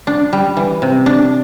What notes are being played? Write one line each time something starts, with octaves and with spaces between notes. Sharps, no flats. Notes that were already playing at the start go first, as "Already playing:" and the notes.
D4
G3
E3
C3
D4